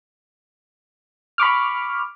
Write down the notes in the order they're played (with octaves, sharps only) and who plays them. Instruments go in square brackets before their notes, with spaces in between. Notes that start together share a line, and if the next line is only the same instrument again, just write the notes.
[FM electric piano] B5 C#6 D6 F6